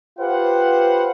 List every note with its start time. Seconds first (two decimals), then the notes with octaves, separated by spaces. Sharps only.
0.19 F4 G4 B4 C5 F#5